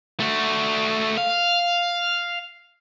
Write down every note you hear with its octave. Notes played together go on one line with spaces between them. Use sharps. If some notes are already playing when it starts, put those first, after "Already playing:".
A3 F#4
F5